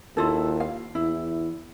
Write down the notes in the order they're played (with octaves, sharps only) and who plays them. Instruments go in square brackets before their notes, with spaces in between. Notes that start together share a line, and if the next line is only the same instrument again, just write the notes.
[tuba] D#2 [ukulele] E4 F4 A4
[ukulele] F5
[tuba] E2 [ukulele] E4